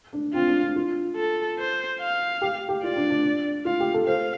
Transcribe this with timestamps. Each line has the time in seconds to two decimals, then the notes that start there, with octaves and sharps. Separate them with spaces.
0.13 D4
0.34 C4 F4
0.48 D4
0.62 D4
0.76 F4
1.16 A4
1.58 C5
2.00 F5
2.41 G4
2.69 G4
2.83 F4 D5
2.96 D4
3.10 D4
3.65 F4 F5
3.80 G4
3.94 A4
4.07 C5 F5